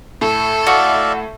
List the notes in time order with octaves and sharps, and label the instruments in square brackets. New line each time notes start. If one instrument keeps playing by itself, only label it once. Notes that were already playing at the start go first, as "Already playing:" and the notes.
[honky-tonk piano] A2 [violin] A4
[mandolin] F#4 [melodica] D5 E5 F5